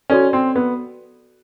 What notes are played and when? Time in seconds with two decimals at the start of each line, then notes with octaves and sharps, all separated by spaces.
0.10 C#4 F#4 A4 D5
0.33 C4
0.56 B3